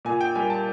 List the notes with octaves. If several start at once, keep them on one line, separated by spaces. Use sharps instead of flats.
A#2 G#5
G5
G3 A#3 G#5
A5